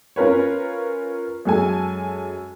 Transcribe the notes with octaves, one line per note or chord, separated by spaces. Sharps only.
C#4 F4 A#4 B4 C#5
F#2 G#3 A4 G#5